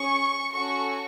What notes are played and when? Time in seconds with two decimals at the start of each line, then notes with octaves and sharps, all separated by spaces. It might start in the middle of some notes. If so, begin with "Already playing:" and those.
Already playing: C#4 G#4 C#6
0.52 C#4 F#4 A4 C#6